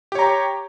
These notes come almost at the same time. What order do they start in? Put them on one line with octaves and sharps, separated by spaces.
G4 C#5 A#5